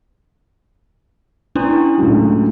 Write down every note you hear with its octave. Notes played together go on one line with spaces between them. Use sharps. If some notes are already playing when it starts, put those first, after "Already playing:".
C#4 D4 E4
C#2 A2 F#3